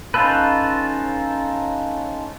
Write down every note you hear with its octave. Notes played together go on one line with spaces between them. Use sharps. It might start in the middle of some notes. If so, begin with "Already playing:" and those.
C#4 D#4 F4 A4 B4